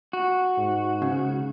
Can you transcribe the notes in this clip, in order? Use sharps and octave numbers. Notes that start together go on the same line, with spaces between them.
F#4
G#2
C#3